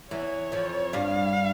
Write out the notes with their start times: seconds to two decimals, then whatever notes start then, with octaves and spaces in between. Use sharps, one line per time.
0.11 E2 E3 C#5
0.52 F2 F3
0.93 G2 G3 F5